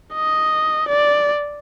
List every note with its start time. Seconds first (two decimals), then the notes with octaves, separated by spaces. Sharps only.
0.14 D#5
0.88 D5